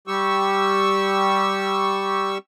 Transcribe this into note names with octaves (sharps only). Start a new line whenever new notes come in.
G3 G4 C#6 E6